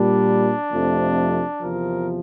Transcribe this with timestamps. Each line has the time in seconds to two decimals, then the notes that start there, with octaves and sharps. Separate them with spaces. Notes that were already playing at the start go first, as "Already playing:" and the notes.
Already playing: A#2 G3 D4
0.71 F2 C3 F3 A3
1.61 E2 C3 F3 A#4